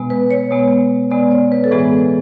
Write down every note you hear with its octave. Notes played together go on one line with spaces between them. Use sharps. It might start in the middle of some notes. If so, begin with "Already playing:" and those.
Already playing: B2 G#3 B3
B4
C#5
B2 G#3 B3
B2 G#3 B3 D5
C#5
B4
A4
A2 E3 G#3 B3 G#4